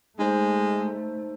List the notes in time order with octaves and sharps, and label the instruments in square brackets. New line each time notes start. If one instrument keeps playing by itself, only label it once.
[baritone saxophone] G#3 [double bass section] A3 [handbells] D#4 C5